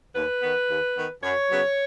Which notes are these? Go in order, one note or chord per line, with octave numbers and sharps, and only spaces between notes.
D#2 B4
D#3 B3
D#2
D#3 B3
F#2 C#5
C#3 F#3 B3